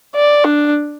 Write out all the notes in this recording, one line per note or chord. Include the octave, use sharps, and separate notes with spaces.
D5
D4